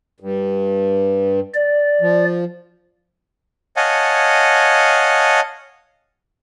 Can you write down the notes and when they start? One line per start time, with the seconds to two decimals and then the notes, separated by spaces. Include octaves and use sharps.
0.20 G2
1.54 D5
2.01 F3
3.76 C#5 D#5 F5 F#5 G#5 A5